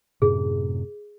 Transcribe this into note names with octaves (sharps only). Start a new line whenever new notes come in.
F#2 A2 C3 G#4